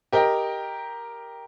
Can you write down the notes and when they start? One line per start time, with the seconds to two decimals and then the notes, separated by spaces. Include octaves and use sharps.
0.12 G4 A#4 D#5 G5